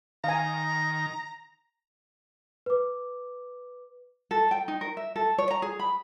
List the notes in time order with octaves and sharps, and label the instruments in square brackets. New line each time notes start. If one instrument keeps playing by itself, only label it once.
[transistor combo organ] D#3 [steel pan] F5 G#5 [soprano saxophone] A#5
[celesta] B4 D6
[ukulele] A4
G5
D#4
A#4
E5
A4
C#5
A#5
G#4
B5